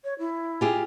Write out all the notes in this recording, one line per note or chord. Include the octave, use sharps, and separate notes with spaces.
C#5
E4
F4 G4 G#4